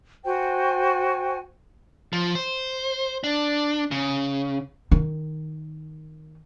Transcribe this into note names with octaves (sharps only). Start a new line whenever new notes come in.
F#4 C5 G5 G#5
F3
C5
D4
C#3
D#3 D#4